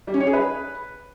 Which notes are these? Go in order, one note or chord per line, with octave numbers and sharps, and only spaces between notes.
G3
C#4
C#5
G#4
B4